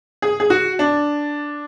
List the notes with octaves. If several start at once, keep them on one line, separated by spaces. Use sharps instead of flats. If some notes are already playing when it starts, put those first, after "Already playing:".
G#4
G#4
F#4
D4